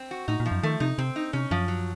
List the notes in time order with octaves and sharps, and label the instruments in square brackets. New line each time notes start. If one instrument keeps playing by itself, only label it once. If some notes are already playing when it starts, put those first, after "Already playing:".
Already playing: [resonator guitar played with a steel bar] C4
F#4
[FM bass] A2 [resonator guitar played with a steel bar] D#4
[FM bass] A#2
[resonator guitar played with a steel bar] F3
[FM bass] F#2
[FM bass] D#3 [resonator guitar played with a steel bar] A3
[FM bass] C3 [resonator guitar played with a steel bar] D#4
[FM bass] C3 [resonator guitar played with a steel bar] C4
[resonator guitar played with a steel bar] D#4
[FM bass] C3 [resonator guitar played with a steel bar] C#4
[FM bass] F#2 [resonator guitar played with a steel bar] F3
[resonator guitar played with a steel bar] F#3